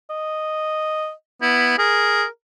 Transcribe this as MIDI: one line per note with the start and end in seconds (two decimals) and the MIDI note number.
0.10 1.12 75
1.42 1.75 59
1.42 1.76 64
1.78 2.24 68
1.78 2.26 70